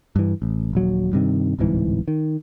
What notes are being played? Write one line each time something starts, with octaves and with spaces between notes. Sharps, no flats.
G2 E3
A1
D#1 A#1 F#3
G2 C3 D#3
D1 C2 G#2 E3
D#3